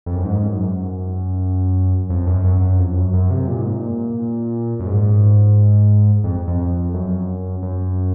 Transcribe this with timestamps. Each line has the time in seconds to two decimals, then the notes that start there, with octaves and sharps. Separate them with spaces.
0.06 F2
0.15 F#2
0.25 G#2
0.48 F#2
2.09 F2
2.27 F#2
2.44 F#2
2.61 F#2
2.79 F2
2.96 F#2
3.13 F#2
3.30 C3
3.48 A#2
3.59 G#2
3.70 A#2
4.79 F#2
4.87 G#2
6.24 F2
6.48 F2
6.94 F#2
7.62 F#2